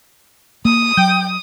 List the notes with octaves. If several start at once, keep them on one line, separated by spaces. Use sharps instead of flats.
A#3 D#6
F#3 G5